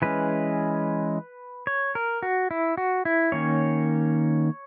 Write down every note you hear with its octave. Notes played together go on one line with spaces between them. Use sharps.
E3 G#3 C#4 B4
C#5
A#4
F#4
E4
F#4
E4
D#3 A#3 C#4 C#5